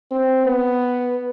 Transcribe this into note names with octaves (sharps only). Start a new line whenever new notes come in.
C4
B3